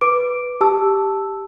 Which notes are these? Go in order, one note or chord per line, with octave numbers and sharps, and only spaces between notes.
B4 D6 D7
G4 A5 E6